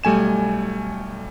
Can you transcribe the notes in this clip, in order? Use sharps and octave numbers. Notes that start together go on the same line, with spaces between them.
B1 G3 A3 G#5 E7